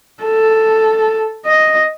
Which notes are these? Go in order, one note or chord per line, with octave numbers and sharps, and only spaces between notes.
A4
D#5